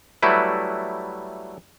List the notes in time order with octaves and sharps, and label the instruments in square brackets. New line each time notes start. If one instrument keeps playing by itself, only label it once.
[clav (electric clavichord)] F#3 G3 A3 E4 B4